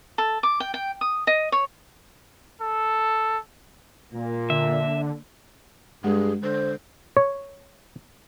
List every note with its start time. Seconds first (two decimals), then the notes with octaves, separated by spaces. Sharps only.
0.18 A4
0.43 D6
0.60 G5
0.74 G5
1.01 D#6
1.27 D#5
1.52 C#5
2.61 A4
4.14 A#2 A#3
4.50 D3 E5
6.04 G2 G#3 G#4
6.43 D3 C5
7.17 C#5